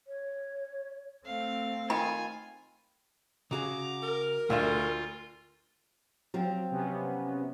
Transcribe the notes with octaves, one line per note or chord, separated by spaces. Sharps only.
C#5
A3 C4 F5
D#3 F4 G#5 B5
C#3 F#4 G#4 A#5 D6
A#4
D2 A3 E4 F4 E5
F3 F#3 C4
C3 B3 C#4